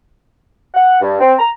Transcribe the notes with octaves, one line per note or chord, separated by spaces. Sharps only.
F#5
G2
C4
A#5